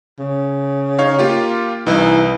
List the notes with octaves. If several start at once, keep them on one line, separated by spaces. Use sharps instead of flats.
C#3
D#4 C#5 F5
A#3 F4 G4
C2 E3 D#4